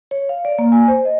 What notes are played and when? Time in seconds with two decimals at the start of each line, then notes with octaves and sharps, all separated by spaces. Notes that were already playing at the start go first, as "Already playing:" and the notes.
0.11 C#5
0.29 F5
0.45 D5
0.59 A#3
0.72 G#5
0.88 C5
1.05 D#5